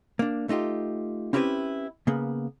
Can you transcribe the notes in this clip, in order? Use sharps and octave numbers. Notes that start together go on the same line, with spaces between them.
A#3 D4
A3 D#4 F4 G4
C4 C#4 E4 G4 A4 B4
C#3 A#3 B3